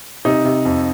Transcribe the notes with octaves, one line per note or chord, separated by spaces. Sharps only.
C3 D#4
C3
F2